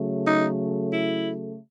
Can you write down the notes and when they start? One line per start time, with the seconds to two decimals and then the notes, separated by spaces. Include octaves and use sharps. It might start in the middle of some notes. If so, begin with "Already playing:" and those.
Already playing: C#3 F#3 A3
0.26 D#4
0.92 E4